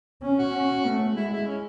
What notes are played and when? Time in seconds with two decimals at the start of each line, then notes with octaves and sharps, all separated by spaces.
0.22 C#4
0.39 F#4
0.55 C#4
0.86 A3
1.16 G#3 E4
1.32 E4
1.47 C#4